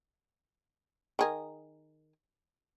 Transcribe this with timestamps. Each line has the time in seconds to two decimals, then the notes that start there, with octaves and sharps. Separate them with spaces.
1.19 D#3 G#4 A#4